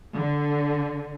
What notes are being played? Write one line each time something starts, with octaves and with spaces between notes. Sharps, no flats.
D3